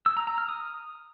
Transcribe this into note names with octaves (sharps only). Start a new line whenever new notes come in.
E6
A#5
A#5
F6
D#6